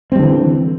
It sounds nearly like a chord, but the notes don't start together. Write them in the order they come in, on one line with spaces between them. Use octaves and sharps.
C4 G3 D3 E3